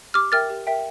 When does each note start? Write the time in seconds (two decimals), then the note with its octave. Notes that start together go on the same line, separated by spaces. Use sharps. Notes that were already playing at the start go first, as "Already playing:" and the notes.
0.14 G4 D6 F6
0.32 A#4 E5 G5 F6 A6
0.50 G4
0.67 A#4 E5 G5